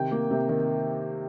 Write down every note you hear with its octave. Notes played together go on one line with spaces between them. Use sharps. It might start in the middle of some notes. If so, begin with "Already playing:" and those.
Already playing: C3 D#3 G5
A#3
C3
D#3